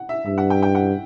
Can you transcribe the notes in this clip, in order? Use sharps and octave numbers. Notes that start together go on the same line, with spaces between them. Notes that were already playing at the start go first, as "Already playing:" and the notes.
Already playing: F#5
E5
G2 E5
F#5
G5
G5
F#5